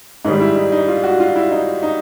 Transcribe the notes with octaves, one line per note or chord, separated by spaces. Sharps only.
G#2 D#3 G3 D#4
E4
D#4
D#4
F4
F#4
F4
E4
D#4
D#4